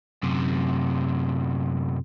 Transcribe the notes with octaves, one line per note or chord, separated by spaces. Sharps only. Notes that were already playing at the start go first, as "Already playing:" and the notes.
F#2 C3